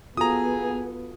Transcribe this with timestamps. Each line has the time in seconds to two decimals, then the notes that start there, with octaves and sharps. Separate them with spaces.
0.17 B3 F4 F#4 G#4 A4 A#5 D#6